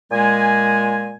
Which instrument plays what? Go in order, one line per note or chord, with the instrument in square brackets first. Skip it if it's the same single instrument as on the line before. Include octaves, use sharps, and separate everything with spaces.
[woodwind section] A#2 G#3 G#5